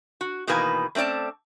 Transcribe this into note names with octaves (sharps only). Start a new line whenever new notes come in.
F#4
B2 D#3 E3 A#3 B4 G#5
A3 C4 C#4 D5 A5